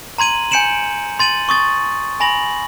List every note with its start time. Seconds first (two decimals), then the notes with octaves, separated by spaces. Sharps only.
0.18 A#5 C6 G#6 D#7 F#7
0.51 G#5 G6 C#7 D7 E7 F#7
1.19 C6 A6 D#7 F#7
1.49 C#6 D#6 A6
2.20 G#5 B5 A#6 F#7